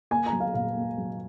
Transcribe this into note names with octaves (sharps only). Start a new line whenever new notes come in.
A#3 G#5
A#5
F#3
F5
A#2 F5
A#3
F#3